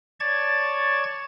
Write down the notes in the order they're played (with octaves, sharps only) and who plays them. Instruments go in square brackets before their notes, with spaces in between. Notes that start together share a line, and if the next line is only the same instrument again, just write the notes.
[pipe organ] C#5 D5 A5 C#6 G#6 A6